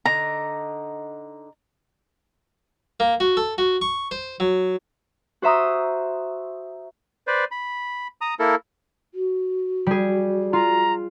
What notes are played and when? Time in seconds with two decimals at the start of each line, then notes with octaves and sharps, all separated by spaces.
0.05 D3 D#4 A#5
3.00 A#3
3.20 F#4
3.37 A4
3.58 F#4
3.81 C#6
4.11 C5
4.40 F#3
5.42 F#4 C5 E5 A#5 D#6
7.27 B4 C5 D5
7.51 B5
8.21 A#5 D#6
8.39 A#3 E4 A4 A#4
9.14 F#4
9.86 G3 G#4
10.53 F4 A#5